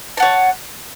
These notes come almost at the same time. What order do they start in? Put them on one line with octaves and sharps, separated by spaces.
A5 F#5 C#5